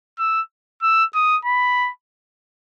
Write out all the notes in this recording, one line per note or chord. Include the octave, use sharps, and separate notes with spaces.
E6
E6
D#6
B5